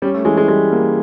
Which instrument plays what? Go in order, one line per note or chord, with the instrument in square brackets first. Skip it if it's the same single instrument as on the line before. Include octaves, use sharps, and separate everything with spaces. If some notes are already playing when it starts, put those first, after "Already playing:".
[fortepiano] G3 [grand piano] C#4
[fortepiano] A3
[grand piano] E3 [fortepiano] G#3
[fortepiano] G#3
[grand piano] G3 [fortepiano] G#3
[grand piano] A#3